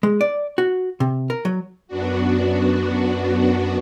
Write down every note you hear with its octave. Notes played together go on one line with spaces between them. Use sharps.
G#3
D5
F#4
C3
A#4
F#3
F#2 B3 D4 F#4